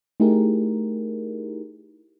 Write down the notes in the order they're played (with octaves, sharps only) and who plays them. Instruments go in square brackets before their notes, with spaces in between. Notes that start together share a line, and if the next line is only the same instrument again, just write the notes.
[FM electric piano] A3 D#4 E4 G4 G#4 A#4